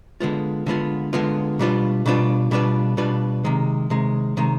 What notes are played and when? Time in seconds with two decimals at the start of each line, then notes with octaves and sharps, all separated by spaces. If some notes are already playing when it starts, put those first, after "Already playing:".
0.20 D3 G#3 B3 F4
0.66 D3 G#3 B3 F4
1.13 D3 G#3 B3 F4
1.59 B2 G3 D4 F4 B4
2.06 B2 G3 D4 F4 B4
2.51 B2 G3 D4 F4 B4
2.97 B2 G3 D4 F4 B4
3.44 C3 D#3 G#3
3.90 C3 D#3 G#3
4.37 C3 D#3 G#3